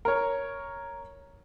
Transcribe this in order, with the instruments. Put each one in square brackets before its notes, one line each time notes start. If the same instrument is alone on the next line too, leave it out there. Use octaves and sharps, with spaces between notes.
[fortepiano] A#4 C#5